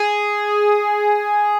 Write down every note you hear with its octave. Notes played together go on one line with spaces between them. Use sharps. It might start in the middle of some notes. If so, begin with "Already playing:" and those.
Already playing: G#4